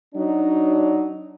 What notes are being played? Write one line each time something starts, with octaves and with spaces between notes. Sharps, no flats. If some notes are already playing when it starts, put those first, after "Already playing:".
F#3 D4 D#4